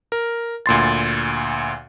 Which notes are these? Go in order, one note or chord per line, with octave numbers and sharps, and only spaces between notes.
A#4
D2 A#2 C6 A6